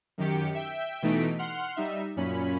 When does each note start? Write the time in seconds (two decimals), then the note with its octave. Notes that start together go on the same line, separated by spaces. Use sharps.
0.18 F#2 D#3 G4 C#7
0.55 E5 G5
1.02 B2 E3 A3 D#4 B6 D7
1.39 F#5 C6 F6
1.76 G3 D#4 E5
2.17 F#2 A#2 C#4 B5